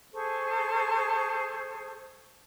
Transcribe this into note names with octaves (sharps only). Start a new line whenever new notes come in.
G#4 A4 C5 C#6